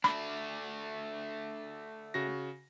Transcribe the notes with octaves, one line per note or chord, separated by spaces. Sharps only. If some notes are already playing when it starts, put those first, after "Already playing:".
A3 D4 B5
C#3 F#4 A#6